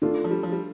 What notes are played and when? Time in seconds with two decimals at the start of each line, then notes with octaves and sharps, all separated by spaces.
0.02 D#3 A3 D4 F4 A4
0.24 F3
0.31 G3
0.43 F3
0.52 G3